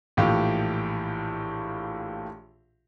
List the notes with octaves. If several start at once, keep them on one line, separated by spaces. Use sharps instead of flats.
A#1 A2 E3 F4 G4